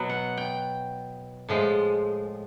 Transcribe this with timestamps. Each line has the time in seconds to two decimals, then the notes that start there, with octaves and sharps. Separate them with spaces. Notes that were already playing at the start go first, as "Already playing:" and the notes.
Already playing: B2 F#3 B3
0.10 F#5
0.37 G5
1.49 A2 F3 G#3